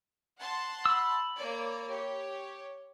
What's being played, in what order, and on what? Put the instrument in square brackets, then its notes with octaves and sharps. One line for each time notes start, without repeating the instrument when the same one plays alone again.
[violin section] F#5 A5 C6
[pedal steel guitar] B5 E6
[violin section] A#3 C#5 D5
G4 C#5